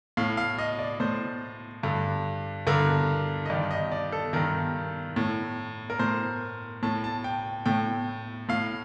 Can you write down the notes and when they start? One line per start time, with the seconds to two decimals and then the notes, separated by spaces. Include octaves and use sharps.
0.17 A2 F5
0.37 F5
0.58 D#5
0.79 D5
1.00 A2 C5
1.83 G2 D3
2.67 G2 D3 A#4
3.45 D#5
3.50 G2 D#3 D5
3.71 D#5
3.92 D5
4.12 A4
4.33 G2 D#3 A#4
5.16 A2
5.90 A#4
5.99 A2 C5
6.83 A2 A5
7.04 A5
7.24 G5
7.66 A2 G5
8.49 A2 F5